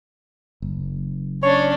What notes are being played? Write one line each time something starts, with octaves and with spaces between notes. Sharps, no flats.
F#1
C#4 D4 C#5